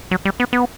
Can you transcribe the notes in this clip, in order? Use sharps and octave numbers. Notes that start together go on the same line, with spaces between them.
F#3
G3
B3
B3